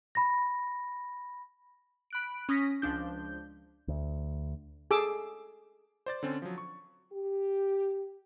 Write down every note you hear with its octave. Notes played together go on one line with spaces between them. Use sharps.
B5 A#6
B5 F#6 D7
C#4 D#6 A#6 B6
C#2 F3 D4 G6
D2
G#4 A4 D6 E6
C5 D5 A6
D3 C4 C#4
F3 F#3
C#6
G4